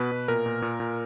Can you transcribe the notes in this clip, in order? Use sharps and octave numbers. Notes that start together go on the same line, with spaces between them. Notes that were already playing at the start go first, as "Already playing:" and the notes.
Already playing: B2 B4
B2
A#2 A#4
A#2
A#2
A#2